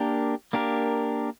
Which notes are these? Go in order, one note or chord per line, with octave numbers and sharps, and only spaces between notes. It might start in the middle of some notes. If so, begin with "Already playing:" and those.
Already playing: A#3 D4 G4 A#4
A#3 D4 G4 A#4